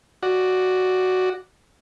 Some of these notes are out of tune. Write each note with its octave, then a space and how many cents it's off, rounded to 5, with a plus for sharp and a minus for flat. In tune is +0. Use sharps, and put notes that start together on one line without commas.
F#4 +0 D5 +0